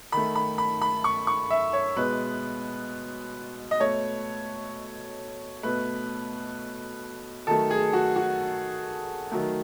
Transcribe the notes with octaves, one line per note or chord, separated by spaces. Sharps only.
D#3 A3 B5
B5
B5
B5
C#6
C#6
E5
C#5
B2 G#3 B4
D#5
B2 A3 C#5
B2 A3 B4
D#3 F#3 A3 A4
G#4
F#4
F#4
D#3 F#3 A3